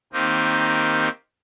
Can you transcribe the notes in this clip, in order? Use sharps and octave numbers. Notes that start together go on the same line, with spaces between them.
D#3 A#3 C4 D#4 G4